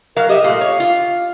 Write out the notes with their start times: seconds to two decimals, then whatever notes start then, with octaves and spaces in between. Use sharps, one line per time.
0.16 F#3 A#4 F5
0.29 G4 D#5 E5
0.44 A#2 A3 F5
0.61 C#5
0.80 F4